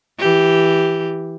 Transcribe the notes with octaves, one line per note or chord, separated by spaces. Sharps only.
E3 G4